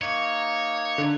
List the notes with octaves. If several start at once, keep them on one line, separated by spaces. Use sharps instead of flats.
A#3 D#4 C#5
D3